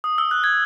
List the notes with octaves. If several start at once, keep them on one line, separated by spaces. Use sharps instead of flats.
D#6
E6
F#6
G#6